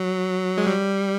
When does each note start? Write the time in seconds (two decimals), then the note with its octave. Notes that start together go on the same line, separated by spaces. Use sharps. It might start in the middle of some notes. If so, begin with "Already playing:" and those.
Already playing: F#3
0.58 G#3
0.67 G3